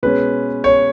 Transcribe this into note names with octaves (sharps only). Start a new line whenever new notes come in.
B2 G#3 C#4 B4
C#5